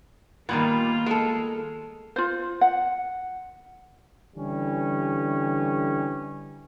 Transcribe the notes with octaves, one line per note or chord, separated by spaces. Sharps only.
A#2 D#3 G3 A#3 B3 F4
G#3 A4
F4 C5
F#5
D3 E3 G3 C#4